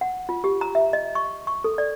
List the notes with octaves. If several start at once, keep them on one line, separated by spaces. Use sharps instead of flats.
F#5
F4
G4
A#5
E5
D#5
C#6
C#6
A4
D5